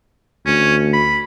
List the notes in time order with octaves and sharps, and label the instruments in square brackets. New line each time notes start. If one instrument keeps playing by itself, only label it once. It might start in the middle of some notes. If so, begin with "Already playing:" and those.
[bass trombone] D2 [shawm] C#4
[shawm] B5